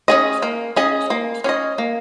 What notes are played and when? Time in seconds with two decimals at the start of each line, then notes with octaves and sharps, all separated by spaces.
0.08 C#4 G#4 D#5
0.42 A#3
0.76 C#4 G#4 D#5
1.10 A#3
1.44 C#4 G#4 D#5
1.78 A#3